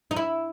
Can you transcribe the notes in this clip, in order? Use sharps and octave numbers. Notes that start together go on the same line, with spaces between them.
D#4
E4